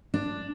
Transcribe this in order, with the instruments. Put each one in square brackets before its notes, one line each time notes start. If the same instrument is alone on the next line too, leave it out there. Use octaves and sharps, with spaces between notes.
[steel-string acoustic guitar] D4